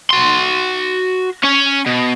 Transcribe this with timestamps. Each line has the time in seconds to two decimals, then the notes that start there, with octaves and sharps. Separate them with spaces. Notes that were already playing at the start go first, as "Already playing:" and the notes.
0.11 F#4 C6
1.43 C#4 C#5
1.86 B2